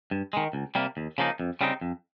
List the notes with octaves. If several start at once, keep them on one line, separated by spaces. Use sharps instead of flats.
G2
D#3 G#3
C#2
C3 G3 A#3
D#2
C#3 F3 A#3 D#4
F2
C#3 G3 C4 D#4
F2